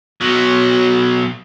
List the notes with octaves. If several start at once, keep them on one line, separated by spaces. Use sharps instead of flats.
B2 F#3